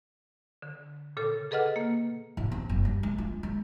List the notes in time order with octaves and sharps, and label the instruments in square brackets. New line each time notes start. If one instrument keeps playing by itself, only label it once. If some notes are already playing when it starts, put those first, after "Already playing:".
[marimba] D3
A#2 C#3 A4
G#4 A4 B4 D#5 F#5 F6
A#3
[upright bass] A1
C4
F#1
G3
G#3
F4
G#3